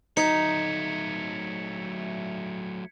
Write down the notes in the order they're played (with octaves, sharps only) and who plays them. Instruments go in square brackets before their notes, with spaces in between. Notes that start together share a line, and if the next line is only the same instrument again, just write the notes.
[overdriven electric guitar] F#3 A3 [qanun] D#4 [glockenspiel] G#6 B6 C#7